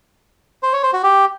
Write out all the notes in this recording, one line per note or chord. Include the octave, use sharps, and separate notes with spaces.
C5
C#5
C5
F#4
G4